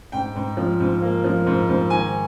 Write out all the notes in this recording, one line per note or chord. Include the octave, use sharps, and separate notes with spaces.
G#2 G5
G#2
F3
G#2
A#3
F3
G#2
G#2
D#3 G#5